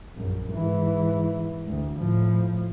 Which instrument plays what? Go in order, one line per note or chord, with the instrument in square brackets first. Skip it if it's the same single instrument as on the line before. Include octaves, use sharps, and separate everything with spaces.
[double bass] A#1 F#2
G#2 E3
D2
A2 F3